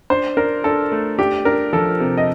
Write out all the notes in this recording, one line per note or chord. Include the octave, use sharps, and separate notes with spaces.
D4 C5
D4 A#4
D4 A4
A3
D4 G4
D4 A#4
F3 A4
C3
D#5